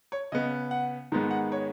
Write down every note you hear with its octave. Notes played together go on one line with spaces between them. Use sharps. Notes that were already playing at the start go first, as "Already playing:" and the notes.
C#5
C#3 B3 D#5
F#5
G#2 D#3 G#3 B3
F#5
C#5